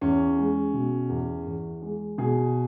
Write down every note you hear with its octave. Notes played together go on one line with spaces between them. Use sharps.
E2 C#4
G#3
B2
E2
E2
G#3
B2 G#4